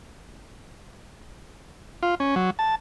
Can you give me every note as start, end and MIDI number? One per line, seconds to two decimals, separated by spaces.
2.03 2.15 65
2.20 2.35 61
2.36 2.50 54
2.59 2.75 81